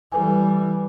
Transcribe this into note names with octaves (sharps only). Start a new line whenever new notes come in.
E3 G3 A4 B4 G#5